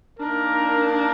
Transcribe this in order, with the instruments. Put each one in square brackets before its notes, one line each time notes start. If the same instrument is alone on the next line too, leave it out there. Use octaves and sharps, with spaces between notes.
[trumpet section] A#3 D#4 A#4 [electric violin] D4